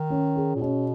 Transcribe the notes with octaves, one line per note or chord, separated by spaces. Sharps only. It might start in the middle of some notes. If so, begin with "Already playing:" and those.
Already playing: D#3
C#4
G#4
A#2
B2 C#4